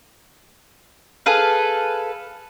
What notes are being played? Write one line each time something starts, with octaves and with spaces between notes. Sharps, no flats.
G#4 A4 B4 F5